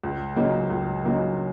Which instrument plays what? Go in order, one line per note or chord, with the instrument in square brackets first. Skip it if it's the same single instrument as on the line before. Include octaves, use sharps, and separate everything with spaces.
[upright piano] C#2
C#3 F#3 A#3 D#4
C#2
C#3 F#3 A#3 D#4